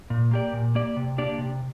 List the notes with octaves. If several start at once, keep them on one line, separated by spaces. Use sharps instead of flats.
A#2
A#3 G4 D5
A#2
A#3 G4 D5
C3
A#3 D4 G4 D5
C3